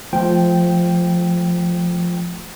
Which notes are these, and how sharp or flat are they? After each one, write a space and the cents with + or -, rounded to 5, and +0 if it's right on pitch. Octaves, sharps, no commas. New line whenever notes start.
F3 +0 A3 -25 G5 -5